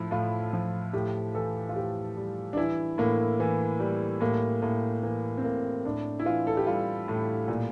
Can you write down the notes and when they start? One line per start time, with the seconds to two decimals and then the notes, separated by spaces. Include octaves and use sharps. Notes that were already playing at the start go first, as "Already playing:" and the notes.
Already playing: A2 F3 E4
0.11 A2 F4
0.53 F3
0.93 A2 G4
1.35 E3 A4
1.69 F4
1.76 A2 G4
2.17 G3
2.53 D4
2.57 E3 E4
2.98 A2 A#3
3.40 E3
3.80 G3
4.21 A2 A#3
4.62 A2 A#3
5.03 E3 A#3
5.38 C4
5.44 A2 A#3
5.85 A2 D4
6.19 E4
6.26 E3 F4
6.47 A4
6.57 G4
6.67 G3 F4
7.08 A2
7.48 A#2